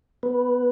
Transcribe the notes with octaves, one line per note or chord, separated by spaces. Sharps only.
B3 B4